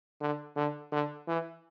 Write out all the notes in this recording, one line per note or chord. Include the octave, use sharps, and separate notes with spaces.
D3
D3
D3
E3